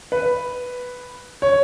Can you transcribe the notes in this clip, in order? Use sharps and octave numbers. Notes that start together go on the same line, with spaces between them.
B4
C#5